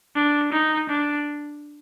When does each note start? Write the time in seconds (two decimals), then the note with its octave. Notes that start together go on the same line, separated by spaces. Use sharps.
0.16 D4
0.52 D#4
0.89 D4